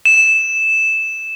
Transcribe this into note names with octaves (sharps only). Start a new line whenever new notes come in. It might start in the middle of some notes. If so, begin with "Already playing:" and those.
E7